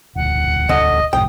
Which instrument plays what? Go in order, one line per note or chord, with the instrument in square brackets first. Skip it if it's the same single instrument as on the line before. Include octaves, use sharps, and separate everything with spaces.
[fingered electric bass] E1 D2 [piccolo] F#5
[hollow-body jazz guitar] D3 [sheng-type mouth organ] D#5
[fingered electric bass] B1 F2 G#2 [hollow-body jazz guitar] G5 [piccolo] D#6